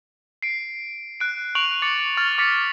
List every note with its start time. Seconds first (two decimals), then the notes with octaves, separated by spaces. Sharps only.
0.42 C7 D7
1.20 F#6 D7
1.55 C#6 F#6 D7 F7 F#7
1.82 C#6 D6 A6 C#7
2.17 C#6 F6 A6 F7
2.38 D6 A6 B6 C#7